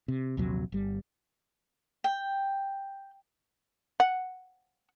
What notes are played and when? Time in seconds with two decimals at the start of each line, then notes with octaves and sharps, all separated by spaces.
0.08 C3
0.37 A#1 D#2 C3 F#3
0.72 G1 G3
2.04 G5
4.00 F#5